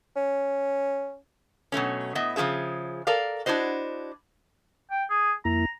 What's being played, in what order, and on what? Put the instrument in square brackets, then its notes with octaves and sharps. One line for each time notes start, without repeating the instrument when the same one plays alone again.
[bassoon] C#4
[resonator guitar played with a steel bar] B2 F#3 A3 C#4
A2 B3 D#5 E5
C#3 F3 C4 G#4 E5
A4 A#4 D5 F5
D4 E4 F#4 C5 D#5
[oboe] G5
G#4
[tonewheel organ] F2 A#3 E4 [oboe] A#5